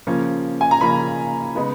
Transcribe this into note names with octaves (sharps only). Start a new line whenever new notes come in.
C#3 F3 A#3 C#4
G#5
A#5
C#3 F3 A#3 C#4 B5
C#3 G#3 B3 D#4